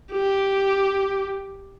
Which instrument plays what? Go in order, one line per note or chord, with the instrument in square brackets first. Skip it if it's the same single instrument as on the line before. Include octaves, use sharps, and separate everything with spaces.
[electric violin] G4